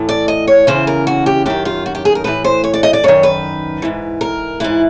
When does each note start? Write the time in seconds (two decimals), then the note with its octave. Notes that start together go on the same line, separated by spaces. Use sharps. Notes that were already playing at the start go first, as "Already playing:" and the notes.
Already playing: A2 E3
0.09 D5
0.28 D#5
0.48 C#5
0.67 E2 C#3 E3 C5
0.87 A#4
1.07 F#4
1.26 G4
1.46 F#2 D#3 G4
1.65 F4
1.86 F#4
1.95 G4
2.05 G#4
2.15 A#4
2.24 A2 E3 B4
2.44 C5
2.64 C#5
2.74 D5
2.83 D#5
2.93 D5
3.04 F#2 D#3 C#5
3.23 B4
3.82 G#2 E3
4.21 A#4
4.60 G#2 E3 E4